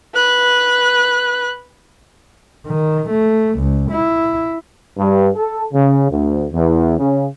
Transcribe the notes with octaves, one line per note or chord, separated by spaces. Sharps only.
B4 F#6
D#3
A3
C#2
E4
G2
A4
C#3
D2
E2
C#3